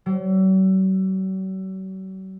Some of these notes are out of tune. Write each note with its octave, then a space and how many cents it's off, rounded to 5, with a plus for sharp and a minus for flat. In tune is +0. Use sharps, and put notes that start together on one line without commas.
F#3 +45